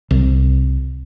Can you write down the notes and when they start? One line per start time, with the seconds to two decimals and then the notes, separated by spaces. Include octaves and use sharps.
0.11 C2